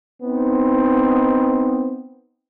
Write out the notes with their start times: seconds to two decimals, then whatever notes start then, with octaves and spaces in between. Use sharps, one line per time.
0.23 B3 C4 D#4